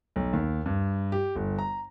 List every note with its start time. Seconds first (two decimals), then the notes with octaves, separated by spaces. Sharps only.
0.16 B1
0.33 D#2
0.66 G2
1.12 G4
1.36 G1
1.59 A#5